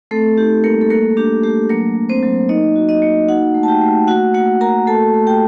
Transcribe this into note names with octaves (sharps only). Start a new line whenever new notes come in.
A3 C4 A4
D#4 G4
G3 A#3 A#4
A4
A3 A#3 A#4
D4 G4
A3 G4
F#3 A#3 A#4
F#3
C4 C5
F#3
A#3 D#4 D#5
F#4
D#4 D#5
A#3
D#4 F#4 F#5
A3
A5
G4 G5
A3
A#3 F#4 F#5
A#3 F#4 F#5
F#4 A#4 A#5
A3 A4 A5
A3
G4 G5